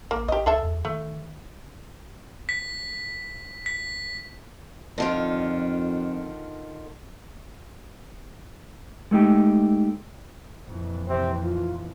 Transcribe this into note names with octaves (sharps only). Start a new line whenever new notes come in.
A1 A#3
A1 G4 D#5
C#2 G#4 A4 E5
E2
D#3 A3
B6
B6
F2 D3 D#3 F4
G#3 A3 D#4 G4
F2 A#2 E3
C3 C4
F4